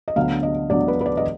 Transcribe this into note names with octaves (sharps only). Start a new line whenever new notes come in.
D#5
D2 D3 F#3 B3 F5
D#5
D2 D3 F#3 B3 D5
B4
B4
D5
D#5